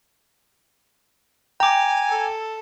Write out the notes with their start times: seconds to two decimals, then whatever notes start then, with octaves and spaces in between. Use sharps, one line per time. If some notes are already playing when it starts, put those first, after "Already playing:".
1.60 G5 G#5 A#5 D6
2.09 A4